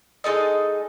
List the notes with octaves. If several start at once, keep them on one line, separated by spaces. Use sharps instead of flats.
G#3 D#4 A4 D#5